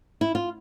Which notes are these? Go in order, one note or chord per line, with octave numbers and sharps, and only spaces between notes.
E4
F4